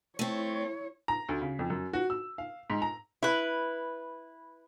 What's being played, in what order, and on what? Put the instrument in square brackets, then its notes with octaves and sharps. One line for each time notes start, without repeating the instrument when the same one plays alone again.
[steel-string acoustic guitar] A3 C4 [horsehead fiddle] E4 C#5
[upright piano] A#5
D2
C#3
F2
F#2
F#4
E6
F5
G#2
A#5
[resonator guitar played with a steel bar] E4 B4